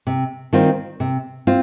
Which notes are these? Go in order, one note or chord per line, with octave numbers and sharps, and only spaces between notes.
C3
D#3 G3 C4 F4
C3
C4 F4